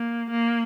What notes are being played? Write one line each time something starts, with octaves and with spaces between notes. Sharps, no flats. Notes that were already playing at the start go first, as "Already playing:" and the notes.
Already playing: A#3
A#3